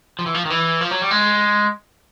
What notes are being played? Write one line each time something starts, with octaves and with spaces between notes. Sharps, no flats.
F3
E3
F3
D#3
E3
F3
F#3
G3
G#3